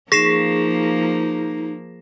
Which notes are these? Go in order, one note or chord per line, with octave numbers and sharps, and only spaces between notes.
F3 A#3 D#4 G#4 A#6 C7 E7